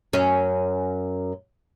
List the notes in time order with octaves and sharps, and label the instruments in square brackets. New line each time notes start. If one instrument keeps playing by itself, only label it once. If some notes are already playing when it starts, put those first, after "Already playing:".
[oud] F#2 C#4